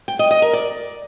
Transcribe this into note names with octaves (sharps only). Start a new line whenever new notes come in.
G5
D#5
D#5
A#4
D5